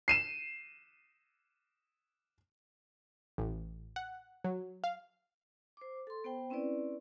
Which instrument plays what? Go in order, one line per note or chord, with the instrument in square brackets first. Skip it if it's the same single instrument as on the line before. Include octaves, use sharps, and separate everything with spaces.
[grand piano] C7 D#7 E7
[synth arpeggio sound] A1
F#5
F#3
F5
[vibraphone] C5 D6
A4 C6
B3 C5 G5
C4 C#4 E4 B4 D5